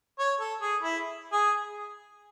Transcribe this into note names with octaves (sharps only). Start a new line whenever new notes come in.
C#5
A4
G#4
E4
G#4